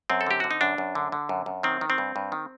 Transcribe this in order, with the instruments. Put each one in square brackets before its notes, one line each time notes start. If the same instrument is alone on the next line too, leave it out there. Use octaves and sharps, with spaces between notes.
[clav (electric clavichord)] F#2 C4
A4
D3 G4
D3 F#4
D#4
F#2 D4
F#2
D3
D3
F#2
F#2
D#3 C4
D#3
C4
G2
G2
D#3